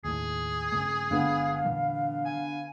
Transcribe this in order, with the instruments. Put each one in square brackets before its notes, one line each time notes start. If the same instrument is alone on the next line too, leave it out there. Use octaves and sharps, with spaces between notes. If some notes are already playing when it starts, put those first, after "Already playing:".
[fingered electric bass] D#2 A2 [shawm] G#4
[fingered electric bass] G2 C#3 A3
[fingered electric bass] G1 G#3 D4 [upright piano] D3 B3 [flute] F5
[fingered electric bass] A#2 E3 G3
[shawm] G#5